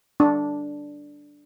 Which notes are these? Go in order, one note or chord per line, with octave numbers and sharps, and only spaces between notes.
D4